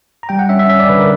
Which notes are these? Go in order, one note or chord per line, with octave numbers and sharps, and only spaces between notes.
A#5
G3 G5
F#5
C#4 E5
E5
C#4 E5
D5
D3 B4
A#4